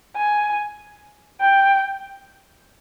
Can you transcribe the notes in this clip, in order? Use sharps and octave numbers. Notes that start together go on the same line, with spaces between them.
G#5
G5